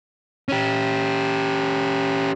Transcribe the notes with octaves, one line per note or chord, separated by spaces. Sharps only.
C#4 G4